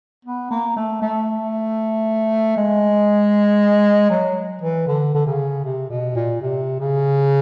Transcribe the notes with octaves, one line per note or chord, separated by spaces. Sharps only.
B3
A#3
A3
A3
G#3
F#3
E3
D3
D3
C#3
C3
B2
A#2
C3
C#3